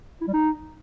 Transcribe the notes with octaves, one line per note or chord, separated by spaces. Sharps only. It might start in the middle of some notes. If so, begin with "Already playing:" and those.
E4
G3
D#4